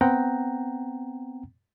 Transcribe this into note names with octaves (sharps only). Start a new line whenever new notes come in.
B3 C4 F#5 G5 A#5